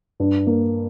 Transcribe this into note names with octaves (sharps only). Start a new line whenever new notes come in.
G2
A#3